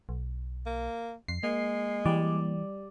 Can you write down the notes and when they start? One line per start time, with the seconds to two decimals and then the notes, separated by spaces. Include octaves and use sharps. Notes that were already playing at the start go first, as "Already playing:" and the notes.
0.09 B1
0.66 A#3
1.28 F2 C7
1.43 G#3 A#3
2.05 E3 G3 D5